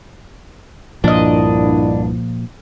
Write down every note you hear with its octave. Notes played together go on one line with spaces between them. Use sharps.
C2 G2 A#2 F3 D4 E4 D#5